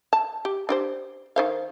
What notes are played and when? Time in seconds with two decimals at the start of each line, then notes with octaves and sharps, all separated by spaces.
0.13 A5
0.45 G4
0.69 D4 G4 C5
1.36 D#3 C5 F5